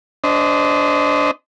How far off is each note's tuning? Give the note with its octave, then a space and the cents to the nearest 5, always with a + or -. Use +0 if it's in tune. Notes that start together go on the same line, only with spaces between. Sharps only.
D4 -25 C5 -20 D#5 +0